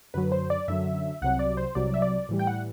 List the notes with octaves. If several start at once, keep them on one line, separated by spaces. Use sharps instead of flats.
F#2 D3 F#3 B4
C5
D5
F#2 D3 F#3 E5
C2 C3 F#3 F#5
D5
C5
C2 C3 F#3 D5
E5
D5
A2 E3 G3
G5
F#5